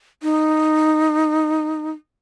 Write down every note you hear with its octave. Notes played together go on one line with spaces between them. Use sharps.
D#4